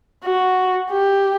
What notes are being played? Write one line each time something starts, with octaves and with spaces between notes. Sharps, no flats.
F#4
G4